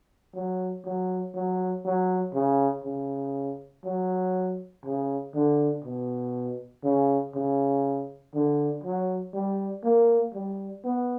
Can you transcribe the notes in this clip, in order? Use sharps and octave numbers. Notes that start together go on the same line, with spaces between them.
F#3
F#3
F#3
F#3
C#3
C#3
F#3
C#3
D3
B2
C#3
C#3
D3
F#3
G3
A#3
G3
B3